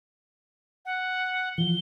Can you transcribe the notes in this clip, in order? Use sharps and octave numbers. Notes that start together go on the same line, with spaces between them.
F#5
E3 F3 G7